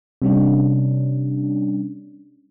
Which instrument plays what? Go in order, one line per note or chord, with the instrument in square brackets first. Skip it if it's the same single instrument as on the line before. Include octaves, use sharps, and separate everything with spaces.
[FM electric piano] C3 G3 C#4 D4